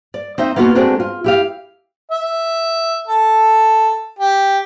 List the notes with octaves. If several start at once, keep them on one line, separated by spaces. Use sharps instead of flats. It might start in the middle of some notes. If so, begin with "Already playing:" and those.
D5
C4 D#4 E5
A#3 B3 D#4 F4 F#4 A#4
G#3 A3 C4 D4 F#4 A#4
F4
E4 G4 F5
E5
A4
G4